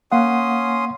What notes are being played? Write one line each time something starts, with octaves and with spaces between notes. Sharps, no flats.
A#3 C#4 F5 F#5 C6 D#6